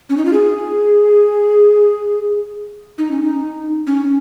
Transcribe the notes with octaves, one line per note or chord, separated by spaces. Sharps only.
C#4
D#4
F4
G#4
D#4
C#4
D#4
C#4